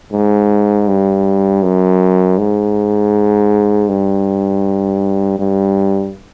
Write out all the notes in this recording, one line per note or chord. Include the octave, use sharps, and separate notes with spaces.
G#2
G2
F#2
G#2
G2
G2